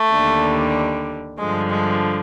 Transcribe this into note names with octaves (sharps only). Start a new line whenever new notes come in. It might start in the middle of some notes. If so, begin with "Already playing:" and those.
Already playing: A3
D#2 D3 G3
G2 D3 F3 G#3
G#3